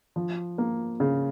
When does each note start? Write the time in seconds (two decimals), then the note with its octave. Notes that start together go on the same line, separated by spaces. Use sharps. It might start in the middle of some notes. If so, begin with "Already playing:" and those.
0.16 F3
0.58 A#3
1.00 C#3